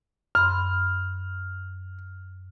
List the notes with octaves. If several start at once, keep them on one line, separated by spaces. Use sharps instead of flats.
F#2 B5 C6 F6